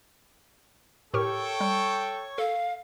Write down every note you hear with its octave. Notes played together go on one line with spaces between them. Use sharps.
A2 G4 A4 A#4 C#5 G5 C#6
G3
A4 F5